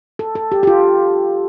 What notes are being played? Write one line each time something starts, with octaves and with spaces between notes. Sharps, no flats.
A4
A4
G4
G4
F4